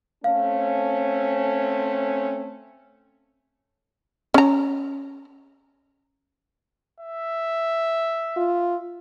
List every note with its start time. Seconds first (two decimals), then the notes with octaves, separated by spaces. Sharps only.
0.24 A3 C4 C#4 F5
4.34 C#4 A#5
7.01 E5
8.37 F4